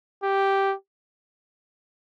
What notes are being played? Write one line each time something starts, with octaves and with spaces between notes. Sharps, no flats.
G4